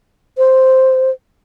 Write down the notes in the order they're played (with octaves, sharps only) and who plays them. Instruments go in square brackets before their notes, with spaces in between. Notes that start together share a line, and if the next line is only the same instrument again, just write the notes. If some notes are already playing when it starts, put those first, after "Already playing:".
[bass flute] C5